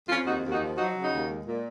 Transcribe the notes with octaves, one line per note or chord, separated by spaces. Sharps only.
F2 C#4 F4
D#2 D#4 F#4
D#2
D#4 F#4
F3
F#3 D#4 F#4
C#3
D#4 F#4
D#2
G#3
A#2